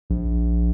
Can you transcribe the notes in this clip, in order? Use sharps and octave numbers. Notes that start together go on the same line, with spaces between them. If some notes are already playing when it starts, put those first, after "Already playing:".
A#1